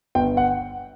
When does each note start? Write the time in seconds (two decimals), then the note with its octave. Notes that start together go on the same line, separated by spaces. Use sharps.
0.15 G1 G5
0.37 F#5